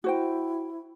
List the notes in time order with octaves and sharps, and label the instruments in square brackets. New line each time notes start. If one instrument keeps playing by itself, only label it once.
[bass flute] E4 [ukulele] F#4 C5 G5